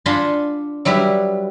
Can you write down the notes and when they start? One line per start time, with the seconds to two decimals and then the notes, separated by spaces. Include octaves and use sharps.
0.06 D4 F4 F#5 G#5 B5 C6
0.85 F#3 G3 E4 B4